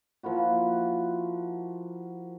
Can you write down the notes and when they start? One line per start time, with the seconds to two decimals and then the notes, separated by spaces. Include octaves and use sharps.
0.23 F3 A#3 E4 F#4